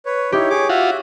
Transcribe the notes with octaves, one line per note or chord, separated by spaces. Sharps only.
B4 C#5
D#4 E4 G4 C#5
G#4 C#5 D6
F4 F#4 E5